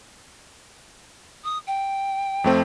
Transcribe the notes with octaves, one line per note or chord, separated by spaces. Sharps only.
D#6
G5
F2 A3 C4